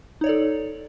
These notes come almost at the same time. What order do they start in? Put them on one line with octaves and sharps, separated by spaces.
D#4 C#5 D5 A4